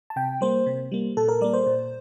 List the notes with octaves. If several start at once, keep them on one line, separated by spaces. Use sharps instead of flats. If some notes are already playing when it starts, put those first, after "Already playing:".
A5
C3 G5
G3 A#3 C5
C3
G3 A#3
A#2 A4
A#4
G3 A#3 D5
C5
A#2